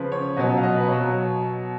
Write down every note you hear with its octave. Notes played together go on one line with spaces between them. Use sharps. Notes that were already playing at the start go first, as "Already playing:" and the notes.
Already playing: C#3 F3 B4
C#5
B2 F#3 D#5
D#5
F5
D#5
B4
B2 F#3 C#5